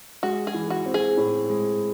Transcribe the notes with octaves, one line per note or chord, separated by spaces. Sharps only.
G#3 F#4
G#4
E3
F#4
C4
G#4
A2
G#3